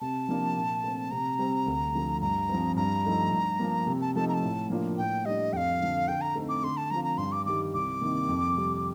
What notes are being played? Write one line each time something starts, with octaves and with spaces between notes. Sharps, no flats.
C3 A5
F3 A#3 D4
A#2
A3 C4
C3 A#5
G3 C4
D2
D3 F3 A3
G2 A#5
F3 C4
G2 A#5
F3 A3 D#4
G2
F3 A#3
C3
A5
F3 A3 D#4 A5
A#5
A5
A2
F3 A#3 D4 F4
A2 G5
G3 D4 D#5
F2 F5 G5
D3 F3
D3 G5
A#5
A3 C4 D#4
D6
D3 C6
A5
F3 C4 F4 A#5
A#5
G2 C6
D6
D#3 G3 D6
C2 D6
C3 D#3 A#3
F2
C3 G3